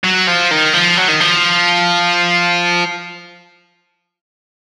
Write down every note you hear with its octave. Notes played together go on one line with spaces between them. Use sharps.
F#3
F3
D#3
F3
F#3
D#3
F3